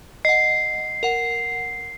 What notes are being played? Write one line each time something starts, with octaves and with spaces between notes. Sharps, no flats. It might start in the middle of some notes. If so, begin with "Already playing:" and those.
D#5 F#5 C7
A#4 F#5